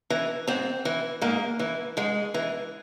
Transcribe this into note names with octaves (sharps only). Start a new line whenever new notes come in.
E3
G#2 C4
E3
G#2 A#3
E3
G#2 G#3
E3